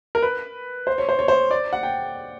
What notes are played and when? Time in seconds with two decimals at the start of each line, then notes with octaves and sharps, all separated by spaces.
0.15 A#4
0.22 B4
0.87 C5
0.98 C#5
1.09 C5
1.19 C#5
1.28 C5
1.51 D5
1.73 F#5
1.83 G5